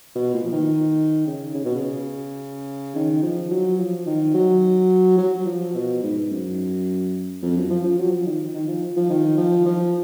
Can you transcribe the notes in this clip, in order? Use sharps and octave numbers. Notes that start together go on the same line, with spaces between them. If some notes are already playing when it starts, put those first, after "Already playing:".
B2
A#2
F3
D#3
C#3
C#3
B2
C#3
D#3
F3
F#3
F3
D#3
F#3
F#3
F#3
F3
B2
G#2
F#2
F2
F#2
F3
F3
F#3
F3
D#3
D#3
F3
F3
D#3
F3
F3